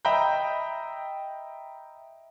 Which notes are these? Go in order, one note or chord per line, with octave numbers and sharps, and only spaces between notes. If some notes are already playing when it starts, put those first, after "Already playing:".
D#5 E5 G5 A#5 B5 G6